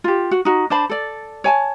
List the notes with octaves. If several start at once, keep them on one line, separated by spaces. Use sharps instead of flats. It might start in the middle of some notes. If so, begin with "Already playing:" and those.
F4 G4
F#4
D#4 F#4
D4 C5 A5 B5
A4 D5
C#5 G#5 A5